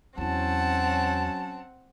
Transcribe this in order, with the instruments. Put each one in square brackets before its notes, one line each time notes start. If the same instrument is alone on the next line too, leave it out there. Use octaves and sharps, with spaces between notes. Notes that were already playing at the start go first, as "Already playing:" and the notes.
[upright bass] E2 E4 [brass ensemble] F#3 C#4 [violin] C4 F#5 [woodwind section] A5